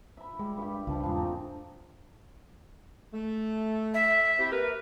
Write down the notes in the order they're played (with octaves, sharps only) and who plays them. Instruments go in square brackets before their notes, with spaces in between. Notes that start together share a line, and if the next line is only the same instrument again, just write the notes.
[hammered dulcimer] E5 B5
[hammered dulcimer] G3 [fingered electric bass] G#3
[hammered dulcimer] G2 G4
[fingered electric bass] C#2 C#3 D4 [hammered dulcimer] F3 G3
[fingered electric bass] E2 G#2 [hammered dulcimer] G#3 D4
[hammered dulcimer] A3 C4 D#4
[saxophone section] A3
[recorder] E5
[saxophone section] C4 E4 G4
A#3 A#4 B4